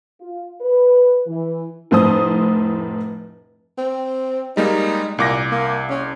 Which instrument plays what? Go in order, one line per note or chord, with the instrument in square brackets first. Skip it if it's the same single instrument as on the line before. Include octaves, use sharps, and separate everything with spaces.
[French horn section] F4
B4
E3
[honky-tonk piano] F1 A2 C5 A5 D#6
[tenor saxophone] C4
[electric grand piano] G3 G#3 A#3 [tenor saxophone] D#4
[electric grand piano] C2 D6 A#6 [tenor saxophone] A#2
[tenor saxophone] A#3
C#4